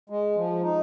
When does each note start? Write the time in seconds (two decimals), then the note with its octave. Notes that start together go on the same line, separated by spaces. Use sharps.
0.10 G#3
0.36 F3
0.63 D#4